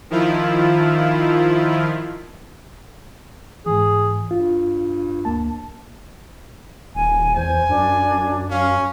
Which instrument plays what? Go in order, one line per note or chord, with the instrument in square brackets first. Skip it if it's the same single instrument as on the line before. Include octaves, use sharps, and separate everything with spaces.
[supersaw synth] D#3 F3 E4 F4
[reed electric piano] G#2 E3 [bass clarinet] G#4
[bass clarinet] G2 [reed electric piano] F4
[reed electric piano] D2 A#3 A5
[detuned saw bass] D#1 [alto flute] G#5
[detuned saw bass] E2 [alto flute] C5 [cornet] G#5
[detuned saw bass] F#2 [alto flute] D4
[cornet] C#4 [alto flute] F5